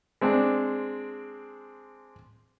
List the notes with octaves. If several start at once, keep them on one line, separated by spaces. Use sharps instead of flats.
G#3 C4 D4